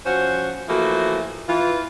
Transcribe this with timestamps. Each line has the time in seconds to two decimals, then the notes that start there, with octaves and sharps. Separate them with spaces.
0.06 F3 C#4 F#4 C5
0.68 E3 F3 A3 A#3 F#4
1.49 E3 F4